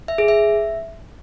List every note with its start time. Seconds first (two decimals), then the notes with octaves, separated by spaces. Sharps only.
0.08 E5
0.18 G#4
0.28 E5